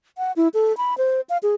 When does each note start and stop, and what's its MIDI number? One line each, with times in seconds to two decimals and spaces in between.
0.18 0.32 78
0.36 0.48 64
0.54 0.75 69
0.77 0.97 83
0.98 1.21 72
1.29 1.37 77
1.43 1.55 68